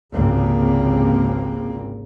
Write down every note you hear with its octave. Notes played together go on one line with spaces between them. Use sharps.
G#1 C#2 C3 A#3 C4